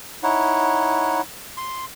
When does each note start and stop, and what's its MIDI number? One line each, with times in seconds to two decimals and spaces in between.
0.23 1.21 63
0.23 1.21 64
0.23 1.21 73
0.23 1.21 78
1.57 1.85 84